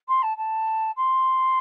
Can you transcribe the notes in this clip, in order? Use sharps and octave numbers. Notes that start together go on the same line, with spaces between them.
C6
A5
A5
C6